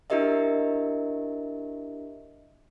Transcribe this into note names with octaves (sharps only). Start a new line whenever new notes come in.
D4 E4 G4 A#4 D#5 E5